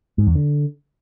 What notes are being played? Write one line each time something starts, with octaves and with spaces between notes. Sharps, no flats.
G#2
E2
D3